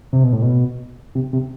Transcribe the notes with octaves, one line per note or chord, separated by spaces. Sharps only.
C3
B2
A2
B2
C3
C3